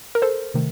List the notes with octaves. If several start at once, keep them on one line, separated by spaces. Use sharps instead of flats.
A#4
A4 C5
C3 D#3 A3